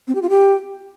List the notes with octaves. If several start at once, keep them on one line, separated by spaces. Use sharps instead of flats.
C4
G4
F4
G4